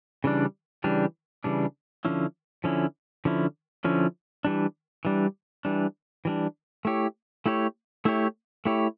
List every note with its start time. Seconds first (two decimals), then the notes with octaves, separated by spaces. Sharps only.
0.24 C#3 E3 G3 D4
0.84 C#3 E3 G3 D4
1.44 C#3 E3 G3 D4
2.05 D3 F3 C#4 E4
2.64 D3 F3 C#4 E4
3.25 D3 F3 C#4 E4
3.84 D3 F3 C#4 E4
4.45 E3 G3 D4
5.05 E3 G3 D4
5.65 E3 G3 D4
6.25 E3 G3 D4
6.85 A3 E4 G4 C#5
7.46 A3 E4 G4 C#5
8.05 A3 E4 G4 C#5
8.65 A3 E4 G4 C#5